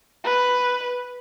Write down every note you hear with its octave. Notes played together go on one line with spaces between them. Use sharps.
B4